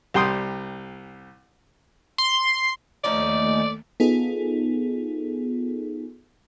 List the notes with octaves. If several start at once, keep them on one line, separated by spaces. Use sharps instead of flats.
C2 G3 G5 C6 D#6
C6
D#2 F3 A3 C#4 D#4 D5
B3 D#4 F4 G#4 A4